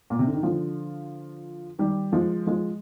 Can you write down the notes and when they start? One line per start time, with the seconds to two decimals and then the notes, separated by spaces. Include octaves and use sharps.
0.10 A#2
0.19 C3
0.27 D3
0.34 D#3
0.43 D3 F3
1.79 D#3 G3
2.12 F3 G#3
2.47 F3 G#3